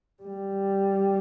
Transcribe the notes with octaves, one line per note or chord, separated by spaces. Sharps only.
G3